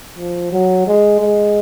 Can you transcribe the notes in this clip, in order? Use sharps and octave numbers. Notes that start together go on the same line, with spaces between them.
F3
F#3
G#3
G#3